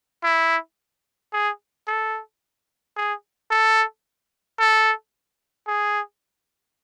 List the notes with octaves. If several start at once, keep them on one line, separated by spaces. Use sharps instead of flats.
E4
G#4
A4
G#4
A4
A4
G#4